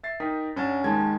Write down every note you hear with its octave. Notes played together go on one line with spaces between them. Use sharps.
E5 A6 C7
D#4 A#4 G5 D#6 B6
G2 C#4 C#5 F#5 A6 E7
D#2 D#3 G#3 G#5 A5 G#6